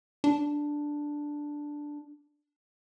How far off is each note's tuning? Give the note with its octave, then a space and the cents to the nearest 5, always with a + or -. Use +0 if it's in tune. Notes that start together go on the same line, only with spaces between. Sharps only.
D4 +0